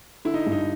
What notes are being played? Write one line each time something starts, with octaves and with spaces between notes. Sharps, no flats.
D3 E4
D#4
G2
D#4